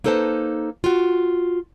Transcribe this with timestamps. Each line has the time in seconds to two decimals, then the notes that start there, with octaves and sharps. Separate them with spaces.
0.04 A#3 D#4 A4 B4 C5 A5
0.84 F4 F#4